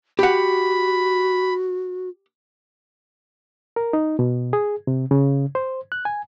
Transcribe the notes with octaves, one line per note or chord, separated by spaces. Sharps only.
F#4 G4 F#5 B5
A#4
D#4
B2
G#4
C3
C#3
C5
F#6
G#5